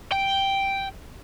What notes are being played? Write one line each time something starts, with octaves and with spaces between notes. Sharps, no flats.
G5